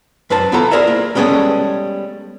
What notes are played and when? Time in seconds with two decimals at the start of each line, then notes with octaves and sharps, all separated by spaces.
0.30 F#2 B4 C5 A5
0.52 B3 E4 F4 A4 A#5
0.71 E4 G#4 A#4 C5 D5 E5
0.87 A#3
1.15 G3 G#3 B3 C#4 G#4 A4